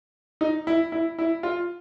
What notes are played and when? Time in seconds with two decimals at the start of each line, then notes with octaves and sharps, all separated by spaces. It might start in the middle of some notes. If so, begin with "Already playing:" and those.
0.41 D#4
0.67 E4
0.92 E4
1.19 E4
1.43 F4